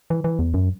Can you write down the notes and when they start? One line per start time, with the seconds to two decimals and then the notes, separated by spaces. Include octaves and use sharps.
0.10 E3
0.24 E3
0.39 E2
0.54 F#2